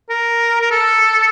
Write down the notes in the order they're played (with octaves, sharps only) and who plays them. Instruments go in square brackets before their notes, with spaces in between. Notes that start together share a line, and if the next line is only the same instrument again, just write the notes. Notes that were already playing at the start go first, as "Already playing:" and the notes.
[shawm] A#4
A#4
A4